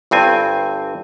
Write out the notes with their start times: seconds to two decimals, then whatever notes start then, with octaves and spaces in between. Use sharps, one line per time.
0.11 G1 G2 C4 G#5